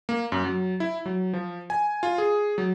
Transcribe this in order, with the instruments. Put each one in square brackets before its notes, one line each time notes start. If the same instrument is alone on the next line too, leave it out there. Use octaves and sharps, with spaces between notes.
[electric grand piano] A#3
F#2
F#3
E4
F#3
F3
G#5
F4
G#4
F#3